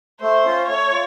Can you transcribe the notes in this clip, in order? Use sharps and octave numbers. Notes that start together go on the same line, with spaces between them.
A3 C5
C#4 F4
A3 C#5
F4